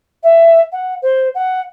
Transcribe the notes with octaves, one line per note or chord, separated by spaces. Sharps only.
E5
F#5
C5
F#5